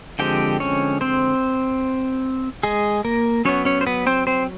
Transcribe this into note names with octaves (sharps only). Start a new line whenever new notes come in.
D3 F3 G#3 C4 G4 G5
C#4 C#5
C4 C5
G#3 G#4
A#3 A#4
F#3 B3 C#4 C#5
C#4 C#5
C5
B3 B4
C4 C5
C4 C5